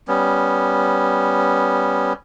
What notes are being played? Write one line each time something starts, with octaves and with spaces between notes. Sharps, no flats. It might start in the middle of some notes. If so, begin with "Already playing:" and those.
G3 B3 C#4